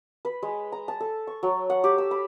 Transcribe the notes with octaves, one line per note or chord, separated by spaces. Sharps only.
B4
G#3
A#5
A5
A4
C#6
F#3
F#5
G4
E6
B5